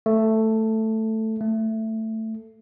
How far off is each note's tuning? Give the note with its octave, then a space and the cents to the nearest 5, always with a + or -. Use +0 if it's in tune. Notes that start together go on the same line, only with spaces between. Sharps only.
A3 +5
A3 +10